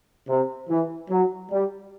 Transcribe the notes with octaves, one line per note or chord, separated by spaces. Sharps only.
C3
E3
F#3
G3